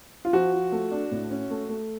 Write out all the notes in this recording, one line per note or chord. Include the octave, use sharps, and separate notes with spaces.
F4
F3 F#4
F3
A3
D4
A2
C#4
A3
A3